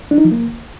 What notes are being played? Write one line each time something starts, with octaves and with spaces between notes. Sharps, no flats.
D4
D#4
F3
A#3